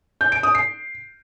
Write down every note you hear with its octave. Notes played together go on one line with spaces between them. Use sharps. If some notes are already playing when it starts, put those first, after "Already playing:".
G6
D7
D#6
C7